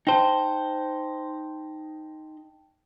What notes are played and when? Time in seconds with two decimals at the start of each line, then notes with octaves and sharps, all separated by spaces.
0.07 D#4 C5 G5 A5